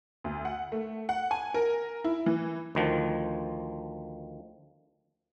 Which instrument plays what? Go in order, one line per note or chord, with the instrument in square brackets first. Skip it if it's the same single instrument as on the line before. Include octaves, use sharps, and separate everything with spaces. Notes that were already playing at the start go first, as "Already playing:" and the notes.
[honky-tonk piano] D2
F#5
A3
F#5
G#5
A#4
E4
E3
[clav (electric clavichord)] D2 D#3 F3